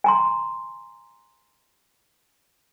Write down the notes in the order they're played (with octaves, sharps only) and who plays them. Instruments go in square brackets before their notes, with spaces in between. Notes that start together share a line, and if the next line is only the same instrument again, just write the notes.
[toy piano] G#5 A#5 C6